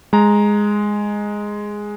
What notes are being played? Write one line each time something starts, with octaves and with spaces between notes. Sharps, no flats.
G#3 A#5